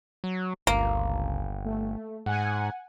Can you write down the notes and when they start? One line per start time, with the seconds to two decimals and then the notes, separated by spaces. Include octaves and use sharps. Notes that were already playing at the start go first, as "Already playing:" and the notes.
0.24 F#3
0.67 G1 C#2 A#3
1.65 A3
2.26 G#2 F#5 G#5